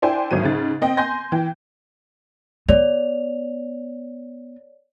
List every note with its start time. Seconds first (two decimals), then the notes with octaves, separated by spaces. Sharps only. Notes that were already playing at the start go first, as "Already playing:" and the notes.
0.02 D4 E4 C5 G5 G#5
0.31 G#1 D2 F#3 D#7
0.43 G#2 C#3 A6
0.82 C4 D#5 G5
0.97 G#5 C6 G6 A#6
1.32 E3 G5
2.69 B3 C#5 D5 F7